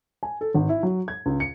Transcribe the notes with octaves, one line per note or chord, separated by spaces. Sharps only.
G#5
A4
G#1
E4
F#3
G#6
C#2
C#7